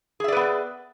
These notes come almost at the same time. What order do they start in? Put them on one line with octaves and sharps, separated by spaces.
G#4 E5 D5 B4 B3